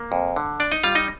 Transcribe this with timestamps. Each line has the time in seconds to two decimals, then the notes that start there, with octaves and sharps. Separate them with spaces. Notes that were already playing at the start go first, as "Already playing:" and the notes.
Already playing: A#3
0.12 F2
0.36 D3
0.60 D4 D5
0.72 D#4 D#5
0.83 G3 F4 F5
0.95 D#4 D#5